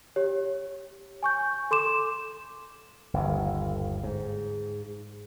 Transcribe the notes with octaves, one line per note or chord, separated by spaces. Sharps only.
G4 C#5
G#5 C#6 G6
A4 C6 D6 E7
G1 D#2
G#2